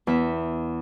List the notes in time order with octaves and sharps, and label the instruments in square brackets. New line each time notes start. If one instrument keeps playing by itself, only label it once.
[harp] E2 E5